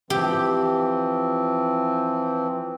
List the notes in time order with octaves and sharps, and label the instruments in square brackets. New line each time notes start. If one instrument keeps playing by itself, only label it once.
[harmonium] E3 F3 C4 [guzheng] G4